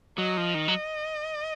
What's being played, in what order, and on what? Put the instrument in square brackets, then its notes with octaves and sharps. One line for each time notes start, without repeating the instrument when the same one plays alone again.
[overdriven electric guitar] F#3 [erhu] D#5
[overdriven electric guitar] F3
D#3
F#3